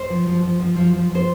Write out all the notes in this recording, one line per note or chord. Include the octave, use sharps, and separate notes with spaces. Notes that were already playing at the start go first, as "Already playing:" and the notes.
Already playing: C5
F3
F3
F3
F3
F3
F3
F3
C5